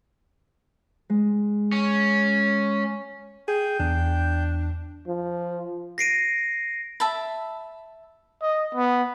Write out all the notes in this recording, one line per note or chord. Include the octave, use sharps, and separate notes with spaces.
G#3
C#4
G#4 G5
E2 D4
F3
A#6 C7 D7 D#7
E5 A5 B5
D#5
B3